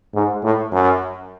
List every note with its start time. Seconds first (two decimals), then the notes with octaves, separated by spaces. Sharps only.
0.15 G#2
0.43 A2
0.72 F#2